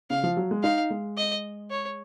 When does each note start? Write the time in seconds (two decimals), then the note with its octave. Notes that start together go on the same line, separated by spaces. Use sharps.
0.10 C#3 F5
0.23 F3
0.37 F#3
0.51 G#3
0.63 D#4 F5
0.90 G#3
1.17 D#5
1.71 C#5